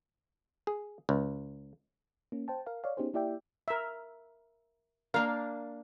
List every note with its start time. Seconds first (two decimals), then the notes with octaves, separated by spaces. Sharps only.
0.67 G#4
1.09 C#2
2.32 A#3 C#4
2.48 C5 G5 A5
2.66 A#4 F5
2.84 C#5 D5 F5
2.97 B3 C#4 D#4 G4 G#4 C5
3.14 A#3 E4 G4 D5 E5 G5
3.68 A#4 E5
5.14 A#3 D4 A#4 F5